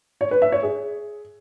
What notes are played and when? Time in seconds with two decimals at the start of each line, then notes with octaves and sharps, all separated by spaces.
0.21 C#5
0.31 B4
0.42 E5
0.52 C#5
0.63 G#4